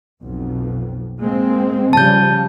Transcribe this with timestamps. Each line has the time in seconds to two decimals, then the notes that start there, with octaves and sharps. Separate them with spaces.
0.22 B1 F2
1.19 G#3 A#3 C4
1.93 C#3 F3 G3 A5 G6